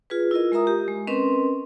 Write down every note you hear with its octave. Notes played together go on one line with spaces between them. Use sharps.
F4 G#4 B4
E4 F4 A#4 D#5
G#3 F4 A#4 E5 A#5 D#6
G4
G#3
C4 C#4 A#4 B4 D#5 C6